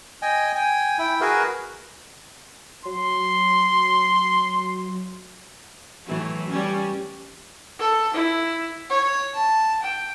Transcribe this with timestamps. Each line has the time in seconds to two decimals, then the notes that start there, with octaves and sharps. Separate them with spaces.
0.22 D#5 G5 G#5
0.55 G5 G#5
0.99 E4 G5
1.21 F#4 G#4 A#4 B4
2.85 F#3 C6
6.07 A2 E3 F#3
6.49 G3 C#4
7.79 A4
8.14 E4
8.90 C#5
9.34 A5
9.82 G5